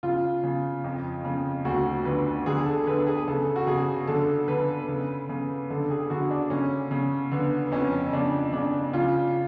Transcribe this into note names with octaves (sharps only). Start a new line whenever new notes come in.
C#3 F4
C#3
F2
C#3
D2 F#4
D3 B4
D3 G#4
A4
D3 B4
G#4
C#3 A4
F#4
C#3 G#4
D3 A4
D3 B4
C#3
C#3
D3 A4
G#4
D3 F#4
D4
C#3 C#4
C#3
D3 B3
B3
F2 C#4
C#3 D4
C#3 D4
C#3 F4